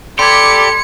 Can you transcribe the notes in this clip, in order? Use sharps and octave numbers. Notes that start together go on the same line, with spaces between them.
G4 A4 D5 B5 C6 G#6 C#7